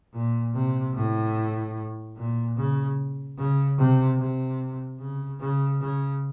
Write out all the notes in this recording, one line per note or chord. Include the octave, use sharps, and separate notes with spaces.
A#2
C3
A2
A#2
C#3
C#3
C3
C3
C#3
C#3
C#3